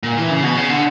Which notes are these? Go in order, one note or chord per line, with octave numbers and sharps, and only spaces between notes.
A#2
E3
C#3
B2
C#3
D3